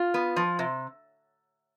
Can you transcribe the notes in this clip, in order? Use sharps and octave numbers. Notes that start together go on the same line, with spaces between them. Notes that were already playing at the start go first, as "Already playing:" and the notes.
Already playing: F4
B3
F3
C3